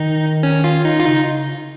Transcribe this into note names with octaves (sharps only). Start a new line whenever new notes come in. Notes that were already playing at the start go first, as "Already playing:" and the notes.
Already playing: D#3 D#4
C#4
F4
D#4
F4
C#3 D#4